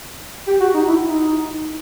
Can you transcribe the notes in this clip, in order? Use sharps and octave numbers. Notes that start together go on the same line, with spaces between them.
G4
F#4
D#4
E4
D#4